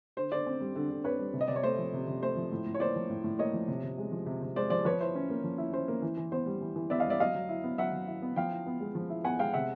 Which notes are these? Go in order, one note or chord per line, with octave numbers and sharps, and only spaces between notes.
D3 C5
D3 C5 D5
C4
G3
D3
D3
C4 B4 C#5
G3
C3
D#5
C3 D5
C#5
A3 C5
F3
C3
C3
A3 C5
F3
A2
A2
C#5
A#3 C5 D5
F3
A2
A2
A#3 C#5 D#5
F3
C3
C3
G#3
F3
C3
C3
G#3 C5 D5
F3 C5 D5
F3 B4 C#5
E4 C5
C#4
A#3
F3
E4
C#4 C5
A#3
E3
E3
B3 C5
G3
E3
E3
B3 D5 E5
D#5 F5
G3
D5 E5
F#3 D#5 F5
F#3
E4
B3
F#3 E5 F#5
F#3
E4
B3
F3 F5 G5
E4
B3
G#3
F3
E4
B3 F#5 G#5
G#3 F5 G5
C3 E5 F#5